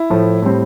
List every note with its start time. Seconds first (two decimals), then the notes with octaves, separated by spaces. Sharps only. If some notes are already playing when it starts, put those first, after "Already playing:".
Already playing: E4
0.10 A2 F3 A3
0.42 A2 G3 C4